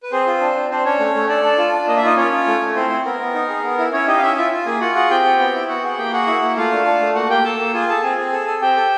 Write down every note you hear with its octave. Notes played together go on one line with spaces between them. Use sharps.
B4
C4 G#4 C5
F4
D4
D4
C4 D4 C5
C#4 D4 C#5
A3
A3
D4 A4 D5
D4
F4
D4
A#3 D#5
E5
D#4 F4 D#5
C#4 F4 C#5
F4
A3
A3
C4 E4 C5
C4
B3 A#4
B3
D#4
G#4
B3
E4
C#4 E4 C#5
D#4 G4 D#5
F5
C#4 E4 E5
E4 F4 E5
F4
A#3 G#4 G#5
F4 F#4 F#5
F#4 G#4 F#5
C4 G4 G5
C4
B3
E4
B3 F#4 F#5
G#4 F#5
A#3 G4 G5
F#4 G#4 F#5
E4
A#3
A3 F4 F5
D4
D4
A3
A#3 F#4 F#5
A#3 G4 G5
A#3 A4 A5
A#3
F4 G#4 G#5
G#4 A4 A5
C4 G#4 G#5
C4
A4
A4
C4 G4 G5
A4